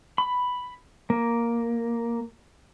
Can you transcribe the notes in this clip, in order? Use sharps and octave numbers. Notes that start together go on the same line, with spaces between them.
B5
A#3